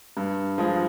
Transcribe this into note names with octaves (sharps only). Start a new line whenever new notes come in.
G2
F3 G#3